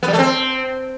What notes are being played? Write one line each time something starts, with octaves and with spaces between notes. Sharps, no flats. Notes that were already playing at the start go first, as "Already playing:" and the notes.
B3
G3
A3
C4